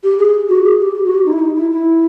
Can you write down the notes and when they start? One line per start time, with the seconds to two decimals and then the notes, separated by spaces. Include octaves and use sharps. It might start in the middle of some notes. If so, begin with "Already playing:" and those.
0.04 G4
0.19 G#4
0.49 F#4
0.64 G#4
0.80 G4
0.94 G4
1.05 F#4
1.15 G4
1.26 D#4
1.32 E4
1.39 D#4
1.55 E4
1.71 E4